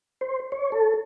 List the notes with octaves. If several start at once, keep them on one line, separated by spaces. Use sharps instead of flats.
C5
C#5
A4